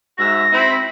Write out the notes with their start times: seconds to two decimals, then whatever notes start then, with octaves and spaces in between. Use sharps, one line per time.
0.18 G#2 F#4 E5 A#6
0.52 C4 E4 B5